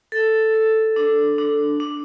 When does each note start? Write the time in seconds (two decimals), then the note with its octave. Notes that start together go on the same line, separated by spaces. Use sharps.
0.12 A4
0.54 A4
0.96 D4
1.38 D4
1.80 D4